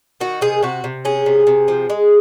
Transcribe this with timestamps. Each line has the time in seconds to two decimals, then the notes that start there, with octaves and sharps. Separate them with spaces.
0.20 D#3 F#4
0.41 C3 G#4
0.63 C3 F#4
0.84 C3
1.05 C#4 G#4
1.26 C3
1.47 C3
1.68 F3
1.90 G#3